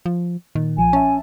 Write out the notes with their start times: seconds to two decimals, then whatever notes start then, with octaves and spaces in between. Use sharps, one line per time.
0.06 F3
0.55 A#2 D#3
0.77 B1 F3 G#5
0.93 C#4 E5 A5